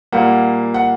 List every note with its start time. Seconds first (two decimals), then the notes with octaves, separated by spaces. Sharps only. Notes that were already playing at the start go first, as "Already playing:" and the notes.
0.12 A#2 G3 A#3 F#5
0.74 F#5